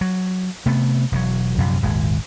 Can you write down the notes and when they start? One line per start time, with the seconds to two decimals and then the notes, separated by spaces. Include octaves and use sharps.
0.01 F#3
0.66 C3 A3 B3
1.12 E1 A#2 F#3
1.58 A#1 F#2 C3
1.82 D#1 G#1 G#3